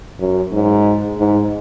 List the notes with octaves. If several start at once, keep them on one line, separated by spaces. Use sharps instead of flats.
F#2
G#2
G#2